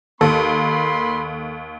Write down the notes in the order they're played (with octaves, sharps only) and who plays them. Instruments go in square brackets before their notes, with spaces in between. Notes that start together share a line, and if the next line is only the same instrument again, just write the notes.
[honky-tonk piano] D#2 [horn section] A#3 B5 C6 [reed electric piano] A4